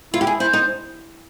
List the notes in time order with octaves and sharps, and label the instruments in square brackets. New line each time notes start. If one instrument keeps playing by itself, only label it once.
[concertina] E4 [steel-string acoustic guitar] F4
[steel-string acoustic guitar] G4
G#4
[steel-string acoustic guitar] E4 [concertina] C5
[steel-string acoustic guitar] D#4